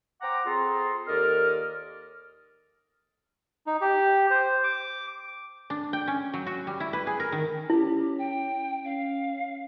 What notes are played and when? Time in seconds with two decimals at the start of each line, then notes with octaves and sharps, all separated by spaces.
0.21 C5 F#5 G5 A#5 D6
0.46 C4 F4 G#4 A4 A#5 C6
1.07 D#2 A4 A#4 D5 D#5 F6
3.67 D#4
3.81 G4
4.30 C5
4.64 D6
5.70 D4
5.93 G5
6.08 C#4
6.34 F#3
6.46 F#4
6.67 G3
6.80 E4
6.93 B4
7.07 G#4
7.20 A#4
7.32 D#3
7.70 C#4 E4 G4
8.18 G5
8.85 C#4 F5